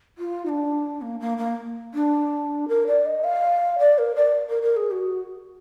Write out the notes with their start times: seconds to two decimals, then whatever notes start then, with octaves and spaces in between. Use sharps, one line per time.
0.18 F4
0.45 D#4
0.49 D4
1.02 A#3
1.20 A#3
1.37 A#3
1.94 D4
2.68 A#4
2.87 D5
3.06 D#5
3.24 F5
3.79 D5
3.98 A#4
4.16 D5
4.49 A#4
4.63 A#4
4.76 G#4
4.91 F#4